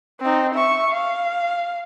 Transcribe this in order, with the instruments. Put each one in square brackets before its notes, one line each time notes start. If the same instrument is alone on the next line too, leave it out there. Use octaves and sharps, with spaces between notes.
[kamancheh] C4 D#4
E5 C#6
F5